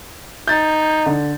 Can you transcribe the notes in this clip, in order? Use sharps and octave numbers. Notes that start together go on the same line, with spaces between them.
D#4 G6 A6
D3